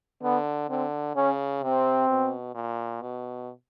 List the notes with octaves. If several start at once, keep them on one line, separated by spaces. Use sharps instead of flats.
D3 B3
D3 C4
C#3 C#4
C3 C4
B2
A#2
B2